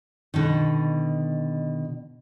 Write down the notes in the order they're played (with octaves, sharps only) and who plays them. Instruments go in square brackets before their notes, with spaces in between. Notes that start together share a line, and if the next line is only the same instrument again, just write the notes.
[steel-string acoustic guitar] B2 D3 D#3